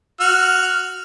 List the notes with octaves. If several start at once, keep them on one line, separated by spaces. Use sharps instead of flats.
F#4 F6